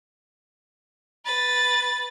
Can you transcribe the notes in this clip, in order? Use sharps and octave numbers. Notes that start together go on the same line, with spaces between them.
B4 A6